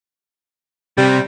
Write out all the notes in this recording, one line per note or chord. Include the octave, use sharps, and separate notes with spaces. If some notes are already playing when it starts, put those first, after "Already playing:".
C3 G3